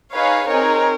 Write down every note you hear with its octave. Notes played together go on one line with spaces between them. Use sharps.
D#4 G#4 B4 C#5 F5
C4 D#4 G#4 A#4 C#5